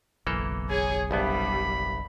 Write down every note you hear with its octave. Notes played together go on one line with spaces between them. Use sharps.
F#1 B1 E3 A#3 A4
G#4 C#5 G#5
C2 G2 G3 B3 B5